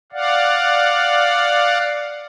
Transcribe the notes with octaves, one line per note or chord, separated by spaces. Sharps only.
D5 F5 F#5